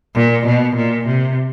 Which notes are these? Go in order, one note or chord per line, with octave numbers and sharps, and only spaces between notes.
A#2
B2
A#2
C3